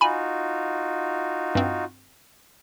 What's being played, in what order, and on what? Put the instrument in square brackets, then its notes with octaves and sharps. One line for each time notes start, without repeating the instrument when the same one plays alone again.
[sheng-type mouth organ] D#4 F4 F#4 [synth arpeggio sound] G#5 B5
[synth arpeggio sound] G2 C4